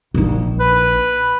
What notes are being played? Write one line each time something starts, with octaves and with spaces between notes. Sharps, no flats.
A#1 D#4
B4